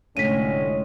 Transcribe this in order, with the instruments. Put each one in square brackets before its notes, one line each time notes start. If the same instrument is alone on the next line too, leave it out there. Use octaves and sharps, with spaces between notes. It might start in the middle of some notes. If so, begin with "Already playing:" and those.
[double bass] F1 G#3 [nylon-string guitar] A2 [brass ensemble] D3 C#4 [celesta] B6 D#7